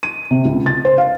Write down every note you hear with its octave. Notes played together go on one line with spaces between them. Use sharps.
D#7
C3
C#2
A6
C5
F5